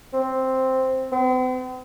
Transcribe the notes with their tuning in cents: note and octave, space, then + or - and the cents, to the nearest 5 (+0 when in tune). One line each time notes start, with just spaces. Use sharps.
C4 +0
C4 -45